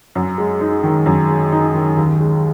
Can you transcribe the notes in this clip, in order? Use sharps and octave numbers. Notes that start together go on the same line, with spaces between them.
F#2
G#3
D#4
D#3
F#2
G#3
D#4
D#3
D#2
G#3